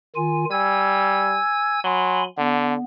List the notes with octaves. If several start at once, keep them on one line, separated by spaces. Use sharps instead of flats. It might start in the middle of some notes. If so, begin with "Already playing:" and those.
D#3 F4 G#5
G3 G#5 E6 G#6
F#3 G#5 B5 C6
D3 B3